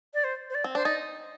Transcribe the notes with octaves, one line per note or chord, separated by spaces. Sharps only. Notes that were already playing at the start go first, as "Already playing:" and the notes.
D5
C5
C5
D5
C4
D4 C5
D#4 D5